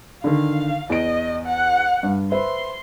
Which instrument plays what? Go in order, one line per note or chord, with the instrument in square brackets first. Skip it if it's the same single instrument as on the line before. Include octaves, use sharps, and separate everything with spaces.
[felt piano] D3 D#3 [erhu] F5
[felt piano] E2 D7 [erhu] D#5
[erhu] F#5
[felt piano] G2
[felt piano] B4 C5 E5 [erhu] C6